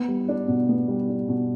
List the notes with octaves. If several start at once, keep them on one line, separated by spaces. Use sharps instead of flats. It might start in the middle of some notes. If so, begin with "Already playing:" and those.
Already playing: B3
G3
D4
B2
B3
G3
D4
B2